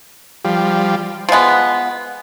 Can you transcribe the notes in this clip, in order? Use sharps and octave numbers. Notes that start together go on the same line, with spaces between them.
F3 G3
F3 G#3 B3